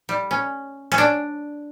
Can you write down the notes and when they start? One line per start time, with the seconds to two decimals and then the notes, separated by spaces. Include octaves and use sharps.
0.09 G3
0.31 C#4
0.92 C#4
0.98 D4